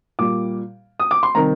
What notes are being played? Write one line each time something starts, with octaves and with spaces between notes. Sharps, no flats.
A#2 G3 D6
D#6
D6
C6
C3 D#3 G3 A#5